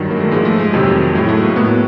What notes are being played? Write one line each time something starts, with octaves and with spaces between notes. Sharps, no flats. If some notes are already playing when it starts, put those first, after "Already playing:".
Already playing: G2 D#3 F#3
A#3
G#3
A3
G#2 F3 G#3
A3
G#3
F2 C3 D#3 F#3
A2 F#3 G#3
A3
A#3
A2 F#3 B3